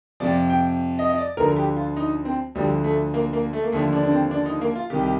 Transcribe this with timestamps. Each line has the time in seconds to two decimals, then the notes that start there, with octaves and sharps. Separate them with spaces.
0.20 F2 C3 F3 D5
0.49 G5
0.99 D#5
1.09 D#5
1.18 D5
1.37 D2 D3 F3 A#4
1.56 G4
1.76 F4
1.96 D#4
2.25 C4
2.55 D2 D3 F3 G3
2.84 A3
3.14 A#3
3.33 A#3
3.53 A3
3.64 A#3
3.72 D#2 D3 F3 A3
3.93 D4
4.03 D4
4.12 C4
4.31 D4
4.46 D#4
4.61 A#3
4.75 F4
4.90 C2 C3 D#3 G4
5.04 G4